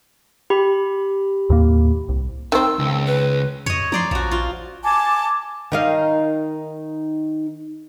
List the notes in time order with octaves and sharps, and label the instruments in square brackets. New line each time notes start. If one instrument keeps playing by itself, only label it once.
[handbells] G4 B5
[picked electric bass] D#2 A2 A#3
C2
[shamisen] D#3 C4 [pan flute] E6
[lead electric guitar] C#2
[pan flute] B4
[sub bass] F2 [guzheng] C#5 D#5
[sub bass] F3 [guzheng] D#4 D5 C6
[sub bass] A#1 [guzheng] F3 F#4
[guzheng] F4
[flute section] G#5 A5 D6
[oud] D#3 D#4 F5